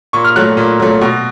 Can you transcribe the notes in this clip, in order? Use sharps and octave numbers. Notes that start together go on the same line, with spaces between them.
A#2 C#6
F6
F#3 A3 F#6
A#2
F#3 A3
B2